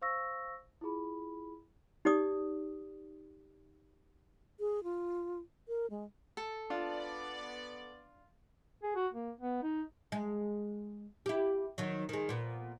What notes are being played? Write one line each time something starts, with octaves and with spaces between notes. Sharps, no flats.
C5 F5 C#6 E6 A#6
E4 F4 G#4 B5
D#4 G4 D5 D#6
G#4
F4
A#4
G#3
A4
B3 D4 F4 D5
G#4
F#4
A#3
B3
D#4
G#3
E4 G4
D#3 F#3
D#3 G#3
A#2 B3